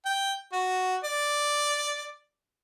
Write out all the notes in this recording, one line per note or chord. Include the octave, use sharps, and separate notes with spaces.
G5
F#4
D5